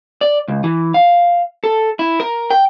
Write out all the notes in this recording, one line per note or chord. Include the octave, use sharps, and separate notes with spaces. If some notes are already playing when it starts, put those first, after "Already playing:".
D5
C#2
E3
F5
A4
E4
A#4
G5